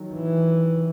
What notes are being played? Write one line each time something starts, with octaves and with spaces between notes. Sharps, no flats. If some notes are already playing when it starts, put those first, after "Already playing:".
Already playing: D#3 F#3
E3